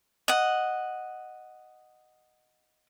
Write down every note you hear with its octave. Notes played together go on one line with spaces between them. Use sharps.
D#5 F#5